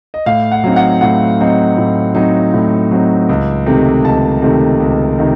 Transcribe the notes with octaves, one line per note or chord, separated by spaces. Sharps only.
D#5
A2 F5
F#5
F#3 C4 D#4
F#5
A2 F#5
F#3 C4 D#4
A2
F#3 C4 D#4
A2
F#3 C4 D#4
C#2
C3 D#3 A3
C#2 A5
C3 D#3 A3
C#2
C3 D#3